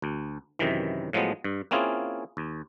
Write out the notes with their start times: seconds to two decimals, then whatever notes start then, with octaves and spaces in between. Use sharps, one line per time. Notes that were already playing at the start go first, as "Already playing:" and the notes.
0.02 D2
0.59 F#2 C3 D#3 E3
1.13 A2 F3 F#3 G#3 B3
1.44 G2
1.71 A#3 C4 C#4 E4 F4 G#4
2.37 D#2